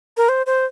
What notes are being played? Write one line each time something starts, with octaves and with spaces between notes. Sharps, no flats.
A#4
C5
C5